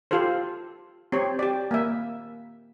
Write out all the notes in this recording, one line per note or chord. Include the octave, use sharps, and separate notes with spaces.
F4 G4 A4 C5
C4 G4 C#5
G4 D5
A#3 E5